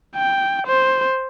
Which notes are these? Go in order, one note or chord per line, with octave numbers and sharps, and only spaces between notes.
G5
C5